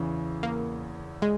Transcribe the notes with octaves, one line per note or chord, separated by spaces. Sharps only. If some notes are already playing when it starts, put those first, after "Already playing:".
Already playing: E2 C#3 E3
A#3
G#3